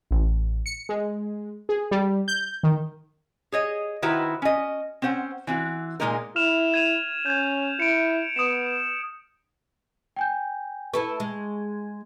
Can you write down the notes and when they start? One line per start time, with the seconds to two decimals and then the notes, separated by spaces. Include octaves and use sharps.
0.11 A1
0.66 C#7
0.89 G#3
1.69 G#4
1.91 G3
2.28 G6
2.63 D#3
3.52 G#4 C#5 D#5
4.02 D#3 E4 F#4 B4 C5 A#5
4.42 C#4 D#5
5.02 C4 C#4 C5 F#5
5.47 E3 C4 F#4
6.00 A#2 E3 G#3 A#3 D#4 A#4
6.36 E4 F6 E7 F7
6.74 G#6 D#7 F7
7.26 C#4 G6 G#6
7.80 E4 C#7 D7
8.36 B3 D#6 C#7 E7
10.16 G5 G#5 G6
10.94 E4 A4 B4 C#6
11.20 G#3